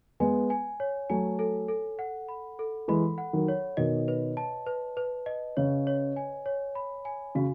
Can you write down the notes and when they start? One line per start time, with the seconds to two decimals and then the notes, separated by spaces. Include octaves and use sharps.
0.20 G#3 B3 G#5
0.50 G#5
0.80 C#5
1.10 F#3 A3 G#5
1.39 A4
1.68 A4
1.99 F#5
2.29 B5
2.59 A4
2.88 E3 G#3 B5
3.18 F#5
3.33 D#3 F#3
3.48 C#5
3.77 B2 D#3 D#5
4.08 B4
4.37 A5
4.66 B4
4.97 B4
5.26 D#5
5.57 C#3 C#5
5.87 C#5
6.16 G#5
6.46 C#5
6.75 B5
7.05 G#5
7.35 C#3 F#4